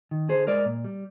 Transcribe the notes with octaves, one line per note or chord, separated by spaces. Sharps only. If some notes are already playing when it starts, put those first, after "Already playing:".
D#3
D3 G#4 C5
G#3 A#4 D5
A#2
G3